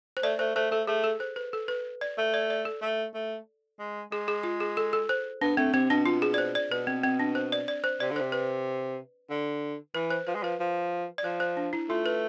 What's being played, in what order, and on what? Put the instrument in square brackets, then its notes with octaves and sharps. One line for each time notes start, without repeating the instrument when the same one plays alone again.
[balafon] C5
[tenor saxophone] A3 [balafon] D5
[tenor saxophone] A3 [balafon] C5
[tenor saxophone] A3 [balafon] C5
[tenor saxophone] A3 [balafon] A4
[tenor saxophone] A3 [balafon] G#4
[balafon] A4
C5
B4
A4
B4
D5
[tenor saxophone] A3
[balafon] D5
D5
A4
[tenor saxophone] A3
A3
G#3
[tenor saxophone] G#3 [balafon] G#4
[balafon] G#4
F4
G#4
A4
A4
C5
[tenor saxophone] B3 [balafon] D4
[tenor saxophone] A3 [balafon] C4
[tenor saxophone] C3 [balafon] C4
[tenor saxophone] B2 [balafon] D4
[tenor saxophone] B2 [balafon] F4
[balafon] G#4
D5
C5
D5
[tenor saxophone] B2 [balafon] B4
[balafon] C4
C4
D4
C5
D5
D5
C5
[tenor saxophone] C3 [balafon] D5
[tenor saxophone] D3
[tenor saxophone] C3 [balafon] C5
[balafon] B4
[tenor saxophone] D3
[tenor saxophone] E3 [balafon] B4
[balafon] C5
[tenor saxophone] F3 [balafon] B4
[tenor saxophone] G#3
[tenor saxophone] F3 [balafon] B4
[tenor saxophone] F3
[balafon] D5
[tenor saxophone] F3 [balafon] C5
[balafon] C5
D4
E4
[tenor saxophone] A3 [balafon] F4
[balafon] B4